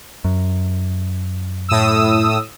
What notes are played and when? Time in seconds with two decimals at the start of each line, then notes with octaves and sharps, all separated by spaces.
0.25 F#2
1.69 A2 D#6 E6